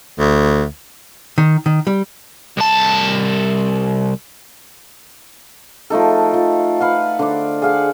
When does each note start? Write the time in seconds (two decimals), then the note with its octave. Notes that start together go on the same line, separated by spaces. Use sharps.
0.19 D2
1.38 D#3
1.66 D#3
1.87 G3
2.58 C2 A5
5.90 F3 A3 D#4 A4
6.34 F3
6.80 B4 F5 F#5
7.19 D3 C5 D5
7.62 G#4 F5 F#5